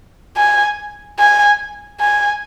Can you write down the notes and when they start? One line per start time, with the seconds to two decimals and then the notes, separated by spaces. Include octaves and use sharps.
0.37 G#5
1.19 G#5
2.01 G#5